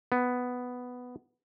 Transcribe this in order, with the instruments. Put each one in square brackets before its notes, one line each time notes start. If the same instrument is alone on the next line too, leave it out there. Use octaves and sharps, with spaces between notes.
[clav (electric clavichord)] B3